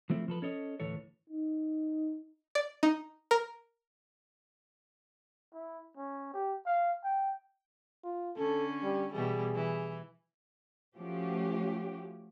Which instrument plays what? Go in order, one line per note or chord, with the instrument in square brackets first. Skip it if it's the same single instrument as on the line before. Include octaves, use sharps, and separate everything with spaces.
[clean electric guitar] F3 A3 C4 E4
F3 A4 B4
C#4 A4 C#5 D#5
D2 A2 E3 A4 C#5
[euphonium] D#4
[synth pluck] D5
D#4
A#4
[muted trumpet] E4
C#4
G4
F5
G5
[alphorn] F4
[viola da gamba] D3 C#4 [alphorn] A4
[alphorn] G3
[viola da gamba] B2 E3 G3 [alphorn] G#4
[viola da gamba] E3
[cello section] F3 A3 C#4 F#4 G4